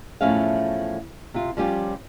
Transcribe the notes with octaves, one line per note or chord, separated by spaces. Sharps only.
E2 A2 F3 C#4 E5 F5
C3 F4
F3 G3 C#4 F4 G4